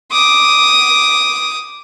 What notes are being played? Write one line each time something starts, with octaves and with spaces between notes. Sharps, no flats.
D6 D#6